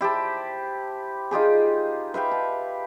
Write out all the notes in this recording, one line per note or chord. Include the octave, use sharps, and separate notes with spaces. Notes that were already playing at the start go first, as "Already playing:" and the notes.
E4 G4 C5 A5
D#4 F4 G4 G#4
B4 E5 F5 G5
A5